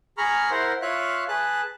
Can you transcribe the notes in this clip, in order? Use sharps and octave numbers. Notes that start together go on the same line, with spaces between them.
G#4 A#5 B5 C#6 F6
E4 A#4 C5 F#5 C6
F4 C#5 E5 F5 C#6 F#6
G#4 B4 A5 F#6